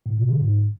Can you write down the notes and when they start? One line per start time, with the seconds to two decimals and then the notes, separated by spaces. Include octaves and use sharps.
0.06 A2
0.17 B2
0.29 D3
0.41 G#2